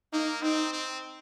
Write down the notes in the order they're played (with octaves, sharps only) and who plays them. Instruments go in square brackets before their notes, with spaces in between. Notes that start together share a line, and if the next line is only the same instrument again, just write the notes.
[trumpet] A#3 [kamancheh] D#4
[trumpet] C4 [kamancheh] D#4
[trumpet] C4